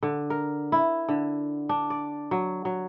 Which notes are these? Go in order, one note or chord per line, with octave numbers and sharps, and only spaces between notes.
D3
A#4
E4
D3
D4
D5
F#3
F#3